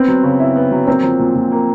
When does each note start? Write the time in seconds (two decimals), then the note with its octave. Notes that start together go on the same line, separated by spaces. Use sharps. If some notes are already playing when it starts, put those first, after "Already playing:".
Already playing: B3 C4
0.08 F#3
0.23 C#3
0.40 E4
0.56 B3
0.72 F#3
0.87 A#3 C4
1.03 F3
1.19 A#2
1.35 A#2
1.52 A#3